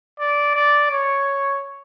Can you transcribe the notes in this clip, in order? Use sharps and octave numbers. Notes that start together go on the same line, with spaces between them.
D5
D5
C#5